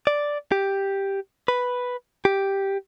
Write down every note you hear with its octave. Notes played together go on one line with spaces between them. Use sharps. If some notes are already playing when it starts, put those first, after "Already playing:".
D5
G4
B4
G4